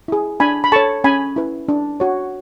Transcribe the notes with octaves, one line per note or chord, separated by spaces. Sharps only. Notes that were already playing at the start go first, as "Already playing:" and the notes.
E4 G#4
D4 G#5 B5
B5
A4 C#5 A5 C#6
C#4 G#5 B5
E4 B4
D4
F#4 C#5